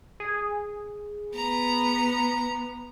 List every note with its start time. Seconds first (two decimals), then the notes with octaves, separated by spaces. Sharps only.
0.20 G#4
1.34 B3 A#5